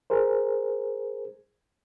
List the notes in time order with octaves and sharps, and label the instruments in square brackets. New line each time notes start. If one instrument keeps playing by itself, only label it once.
[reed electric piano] G#4 A#4 C5